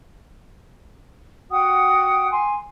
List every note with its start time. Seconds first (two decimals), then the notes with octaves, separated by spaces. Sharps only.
1.51 F#4 F#5 G5 D#6
2.30 G#5 C6